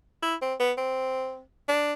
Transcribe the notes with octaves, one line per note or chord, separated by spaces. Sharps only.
E4
C4
B3
C4
D4